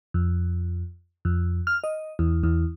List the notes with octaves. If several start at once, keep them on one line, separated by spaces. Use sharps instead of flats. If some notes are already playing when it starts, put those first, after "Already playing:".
F2
F2
F6
D#5
E2
E2